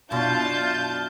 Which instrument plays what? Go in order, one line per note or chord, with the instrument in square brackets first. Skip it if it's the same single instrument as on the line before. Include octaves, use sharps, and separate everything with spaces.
[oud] F#2 B2 [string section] D4 E4 [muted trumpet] F4 [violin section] A5 G6